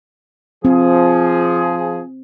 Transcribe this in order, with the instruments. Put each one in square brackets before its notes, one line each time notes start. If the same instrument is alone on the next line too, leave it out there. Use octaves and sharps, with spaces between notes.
[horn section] F3 G#4 [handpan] C4